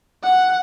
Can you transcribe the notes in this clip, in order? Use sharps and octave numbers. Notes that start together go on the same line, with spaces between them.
F#5